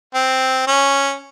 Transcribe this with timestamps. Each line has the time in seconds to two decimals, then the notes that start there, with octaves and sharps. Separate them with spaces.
0.14 C4
0.67 C#4